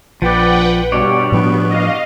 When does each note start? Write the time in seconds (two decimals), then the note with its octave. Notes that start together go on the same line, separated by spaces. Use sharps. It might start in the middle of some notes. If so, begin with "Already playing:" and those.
0.22 A#1 F3 B4 D5 F#5 G5
0.92 G2 B2 G3 F#4 C#5 D5
1.32 A2 F3 B3 D4
1.70 D#5 F5